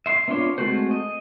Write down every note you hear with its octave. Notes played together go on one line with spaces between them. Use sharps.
E5 C6
B3 D4 F4 C#5 C6
G#3 A3 C4 F#4 C5
D#5